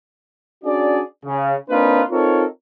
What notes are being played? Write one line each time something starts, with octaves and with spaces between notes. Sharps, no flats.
C#4 D4 F#4 G#4 D5
C#3
A#3 C4 D4 D#4 F4 B4
C4 D#4 F4 A4 A#4 C#5